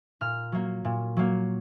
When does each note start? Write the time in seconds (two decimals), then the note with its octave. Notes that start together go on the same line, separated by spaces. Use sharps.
0.21 A#2 F6
0.52 F#3 A#3
0.85 A#2
1.17 F#3 A#3